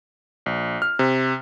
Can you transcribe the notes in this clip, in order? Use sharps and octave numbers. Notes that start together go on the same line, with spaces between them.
A#1
F6
C3